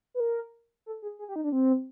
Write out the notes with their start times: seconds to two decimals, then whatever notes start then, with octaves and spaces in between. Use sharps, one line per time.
0.14 B4
0.20 A#4
0.86 A4
1.02 G#4
1.19 G#4
1.29 G4
1.36 D#4
1.44 D4
1.52 C4